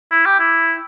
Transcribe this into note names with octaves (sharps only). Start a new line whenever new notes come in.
E4
G4
E4